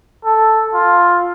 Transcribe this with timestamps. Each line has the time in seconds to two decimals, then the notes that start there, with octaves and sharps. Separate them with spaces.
0.25 A4
0.74 F4